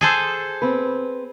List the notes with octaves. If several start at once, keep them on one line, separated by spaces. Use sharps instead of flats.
G#4 A4 C5
C4 B4